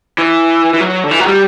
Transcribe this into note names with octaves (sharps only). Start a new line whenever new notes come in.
E3
E3
F#3
D3
E3
F#3
G3